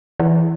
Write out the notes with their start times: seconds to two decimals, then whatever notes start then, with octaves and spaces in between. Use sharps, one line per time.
0.20 E3